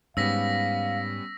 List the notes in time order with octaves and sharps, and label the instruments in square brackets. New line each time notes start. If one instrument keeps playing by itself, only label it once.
[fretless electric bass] G#2 [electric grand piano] G3 B3 C#4 [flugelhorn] F5 [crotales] E6 A#6 B6